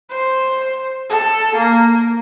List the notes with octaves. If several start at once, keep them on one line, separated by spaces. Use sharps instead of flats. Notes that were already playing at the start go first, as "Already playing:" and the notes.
C5
A4
A#3